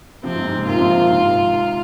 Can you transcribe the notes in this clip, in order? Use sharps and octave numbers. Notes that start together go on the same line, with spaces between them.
C3 F3 C4
G#2 C3
G#2
G#2 C3
A#2 D#3 F4
C3 F3
C3 F3
A#2 D#3
G#2 C3